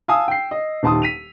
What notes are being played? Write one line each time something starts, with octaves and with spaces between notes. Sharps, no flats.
F5 G#5 A5 D#6 E6
G5 C7
D#5
D#1 D#2 A5 C6 D#6
B6 D#7 F7